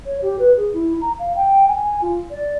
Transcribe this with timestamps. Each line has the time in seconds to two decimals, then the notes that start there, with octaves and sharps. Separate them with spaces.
0.06 C#5
0.22 G4
0.39 B4
0.57 G#4
0.73 E4
1.01 A#5
1.19 F5
1.36 G5
1.68 G#5
2.02 F4
2.31 D5